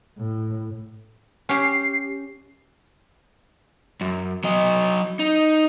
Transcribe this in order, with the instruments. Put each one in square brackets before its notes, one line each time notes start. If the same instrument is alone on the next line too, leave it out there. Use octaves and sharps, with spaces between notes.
[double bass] A2
[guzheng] C#4 G4 [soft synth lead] C7
[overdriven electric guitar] F#2
F#3 D#5
D#4